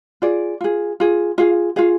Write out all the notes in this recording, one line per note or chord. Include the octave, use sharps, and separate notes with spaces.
F4 G#4 D5
F4 G#4
F4 G#4
F4 G#4 F5
F4 G#4 F5